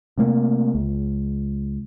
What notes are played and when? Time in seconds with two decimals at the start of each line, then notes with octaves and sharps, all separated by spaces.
0.18 C3 A3 A#3
0.75 C#2